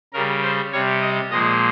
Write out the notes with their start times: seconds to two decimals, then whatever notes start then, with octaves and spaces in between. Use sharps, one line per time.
0.13 C#3 G3 A#4
0.43 C5
0.72 C3 G3 C#5
1.02 D#5
1.31 A#2 F3 G#3 D#5